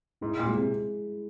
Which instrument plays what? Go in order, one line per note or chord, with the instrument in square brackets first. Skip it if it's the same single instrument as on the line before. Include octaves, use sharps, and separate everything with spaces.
[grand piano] G#2 [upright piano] E4
[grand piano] A#2
[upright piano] G#3
[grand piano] C3